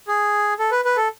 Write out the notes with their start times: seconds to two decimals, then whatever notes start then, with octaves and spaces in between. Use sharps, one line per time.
0.08 G#4
0.59 A4
0.71 B4
0.85 B4
0.97 A4